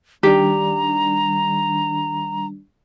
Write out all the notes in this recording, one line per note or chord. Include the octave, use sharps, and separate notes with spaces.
D#3 G3 D4 G4 A#5